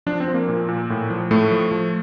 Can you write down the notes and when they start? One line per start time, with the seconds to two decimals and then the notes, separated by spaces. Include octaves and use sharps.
0.06 F3 D4
0.20 C4
0.28 F3
0.34 A#3
0.49 A#2
0.68 A#2
0.90 A2
1.10 F3
1.31 A2 A3
1.51 F3
1.72 F3